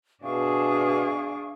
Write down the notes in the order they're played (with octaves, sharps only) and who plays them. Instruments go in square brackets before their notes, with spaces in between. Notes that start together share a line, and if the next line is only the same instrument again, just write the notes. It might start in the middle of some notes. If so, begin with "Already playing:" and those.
[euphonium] B2 [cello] D4 G#4 [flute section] E5 F5 C#6